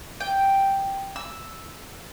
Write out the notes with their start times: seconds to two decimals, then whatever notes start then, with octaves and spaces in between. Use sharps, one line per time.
0.20 G5
1.16 E6